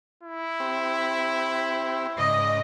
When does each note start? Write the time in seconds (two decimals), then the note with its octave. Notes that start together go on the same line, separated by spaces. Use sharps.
0.23 E4
0.60 C4 G4
2.19 G#2 C#3 D5 D#5 D#6